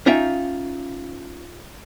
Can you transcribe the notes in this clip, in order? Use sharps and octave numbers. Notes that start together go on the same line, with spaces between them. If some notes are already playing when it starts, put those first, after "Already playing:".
C#4 D#4 F4 E5 G5